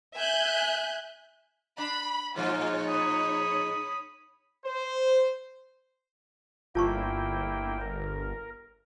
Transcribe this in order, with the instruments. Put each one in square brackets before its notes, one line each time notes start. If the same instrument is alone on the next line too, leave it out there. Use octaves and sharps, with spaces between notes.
[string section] E5 G#5 F#6 G6
[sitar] D4 [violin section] B5
[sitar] A2 F3 G#3 [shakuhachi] D#4 [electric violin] F4 [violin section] C#5
[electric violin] B5 D#6
[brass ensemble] C5
[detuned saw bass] G1 [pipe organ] A#3 E4 G5 [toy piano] F4 A5 C#6
[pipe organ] A#4